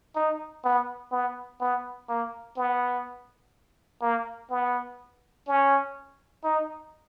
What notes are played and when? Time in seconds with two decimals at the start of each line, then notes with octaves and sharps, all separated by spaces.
0.16 D#4
0.64 B3
1.12 B3
1.61 B3
2.09 A#3
2.57 B3
4.02 A#3
4.50 B3
5.48 C#4
6.44 D#4